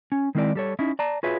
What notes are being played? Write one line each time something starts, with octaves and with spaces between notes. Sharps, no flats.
C#4
D#3 G#3 C4 E4 A#4 D5
G3 A4 C#5
C#4 D#4 E4
D5 A5 A#5
F4 F#4 G#4 B4 C#5 E5